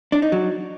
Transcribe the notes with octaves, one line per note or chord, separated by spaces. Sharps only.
D4
D#4
F#3